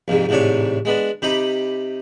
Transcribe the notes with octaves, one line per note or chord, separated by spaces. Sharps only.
A#1 F2 G#2 C3
A1 G#2 C3 D4 C#5
G#3 B3 D4
C3 D#4 G4 B5